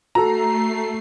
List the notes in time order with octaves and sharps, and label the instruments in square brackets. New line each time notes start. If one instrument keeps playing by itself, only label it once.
[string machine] A3 C7 [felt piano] F#4 A4 [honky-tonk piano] A#5